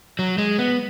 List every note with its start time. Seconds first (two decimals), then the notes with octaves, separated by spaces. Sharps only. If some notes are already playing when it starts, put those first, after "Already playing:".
0.19 F#3
0.38 G#3
0.59 B3